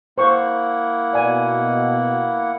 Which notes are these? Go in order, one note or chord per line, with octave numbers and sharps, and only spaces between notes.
A#3 E4 C5 F#5 C#6
B2 D5 G#5